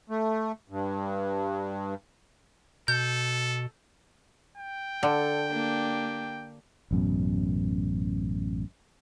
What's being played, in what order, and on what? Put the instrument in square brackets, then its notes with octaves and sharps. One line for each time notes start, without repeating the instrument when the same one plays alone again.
[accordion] A3
G2
[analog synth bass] B2 [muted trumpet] A4 [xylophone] G6
[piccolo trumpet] G5
[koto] D3 [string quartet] A4
[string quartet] A#3 D4 G4
[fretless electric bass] A1 F#2 B2